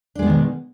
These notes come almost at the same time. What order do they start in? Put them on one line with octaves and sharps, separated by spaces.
D4 G#3 B3 D#3 B2